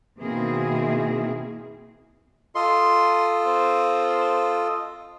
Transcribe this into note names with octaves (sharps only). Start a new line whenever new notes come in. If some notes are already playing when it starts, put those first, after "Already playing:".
B2 D#3 A#3 C4 E4 G#4
F4 A4 D#5 C6
C4